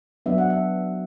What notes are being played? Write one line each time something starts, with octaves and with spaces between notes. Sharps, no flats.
F#3 B3 D4 E5
F#5
E5